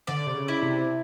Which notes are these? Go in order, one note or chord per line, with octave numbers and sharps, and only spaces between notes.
D3 D5
C3
C#3
E4
C3